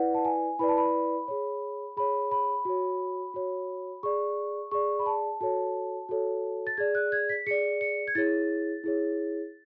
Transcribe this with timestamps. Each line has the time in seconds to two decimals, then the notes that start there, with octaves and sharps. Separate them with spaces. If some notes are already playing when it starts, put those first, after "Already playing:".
Already playing: E4 B4 D5 F#5
0.14 A5
0.25 G#5
0.59 E4 B4 D5 B5
0.68 A5
0.77 B5
1.28 G#4 C#5
1.97 G#4 C#5 B5
2.31 B5
2.65 F#4 C#5
3.34 F#4 C#5
4.03 G#4 D5 C#6
4.71 G#4 D5 C#6
4.99 B5
5.06 A5
5.41 F#4 A4 C#5 A5
6.09 F#4 A4 C#5
6.67 A6
6.77 G#4 D5 G#6
6.95 F#6
7.12 G#6
7.29 B6
7.47 G#4 D5 C#7
7.81 C#7
8.08 G#6
8.15 E4 G#4 C#5 A6
8.84 E4 G#4 C#5